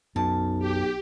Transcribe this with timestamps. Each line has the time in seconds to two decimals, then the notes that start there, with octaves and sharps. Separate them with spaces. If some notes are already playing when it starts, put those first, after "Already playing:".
0.16 B1 F#2 A5
0.59 G4